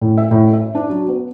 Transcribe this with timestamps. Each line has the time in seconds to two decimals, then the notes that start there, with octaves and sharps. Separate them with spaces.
0.01 A2
0.18 E5
0.31 A2
0.53 E5
0.75 D4
0.90 F#3
1.08 B3